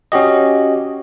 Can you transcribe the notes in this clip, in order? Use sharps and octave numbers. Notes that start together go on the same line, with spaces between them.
C#4 F#4 G4 D#5